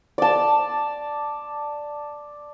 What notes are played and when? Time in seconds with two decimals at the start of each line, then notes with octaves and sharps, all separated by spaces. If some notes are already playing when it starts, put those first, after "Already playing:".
0.18 D5 A5